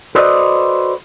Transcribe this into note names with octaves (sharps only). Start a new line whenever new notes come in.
F#4 A4 B4 C5 D5 D#5